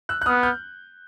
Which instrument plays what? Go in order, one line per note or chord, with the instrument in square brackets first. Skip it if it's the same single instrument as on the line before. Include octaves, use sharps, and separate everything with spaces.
[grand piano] E6 F#6
F#6
[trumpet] B3 [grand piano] D#6 F6
[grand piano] F6 G6